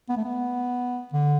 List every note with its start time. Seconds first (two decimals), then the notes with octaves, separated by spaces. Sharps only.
0.09 B3
0.17 A3
0.24 B3
1.13 D3